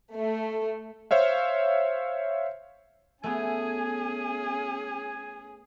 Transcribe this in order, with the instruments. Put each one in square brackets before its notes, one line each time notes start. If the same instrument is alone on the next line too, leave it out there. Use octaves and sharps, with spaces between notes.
[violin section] A3
[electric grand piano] C5 C#5 E5 F5
[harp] A3 B3 [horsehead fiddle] C#4 G#4 [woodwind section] G#5